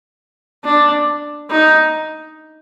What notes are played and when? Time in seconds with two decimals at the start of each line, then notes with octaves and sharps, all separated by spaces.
0.64 D4
1.50 D#4